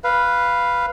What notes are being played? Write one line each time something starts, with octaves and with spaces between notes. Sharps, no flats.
B4 F5